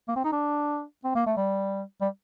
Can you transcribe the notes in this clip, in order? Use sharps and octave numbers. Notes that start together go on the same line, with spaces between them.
A#3
C4
D#4
D4
C4
A#3
A3
G3
G3